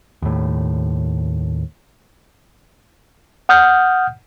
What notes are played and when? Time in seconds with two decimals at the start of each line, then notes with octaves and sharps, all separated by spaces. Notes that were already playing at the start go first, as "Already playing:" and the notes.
0.22 D#2 A2
3.49 F#5 D#6 F6 G6